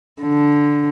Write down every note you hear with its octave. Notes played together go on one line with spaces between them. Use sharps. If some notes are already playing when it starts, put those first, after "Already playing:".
D3